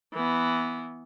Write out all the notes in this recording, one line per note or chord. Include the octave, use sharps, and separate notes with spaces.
E3 B3